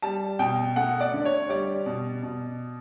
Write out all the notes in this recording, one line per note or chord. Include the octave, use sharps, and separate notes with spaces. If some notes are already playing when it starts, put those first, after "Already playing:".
G3 A5
B2 G5
A3 F#5
D5
D3
C#5
G3 D5
B2
B2